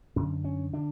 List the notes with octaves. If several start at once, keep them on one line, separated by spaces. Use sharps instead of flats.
F#2 D3 C#4
C#4
D3 D4